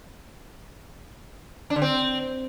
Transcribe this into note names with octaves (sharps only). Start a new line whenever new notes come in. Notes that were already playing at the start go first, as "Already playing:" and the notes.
D4
D3
C4